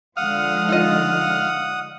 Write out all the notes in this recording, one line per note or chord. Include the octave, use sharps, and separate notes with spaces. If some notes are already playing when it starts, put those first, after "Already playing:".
D3 F3 G#3 F5 F#5 D#6
D#4 F4 D#5